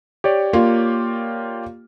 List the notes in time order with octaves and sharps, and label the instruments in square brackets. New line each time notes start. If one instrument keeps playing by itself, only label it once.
[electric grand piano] G4 C#5 D5
[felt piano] A#3 F4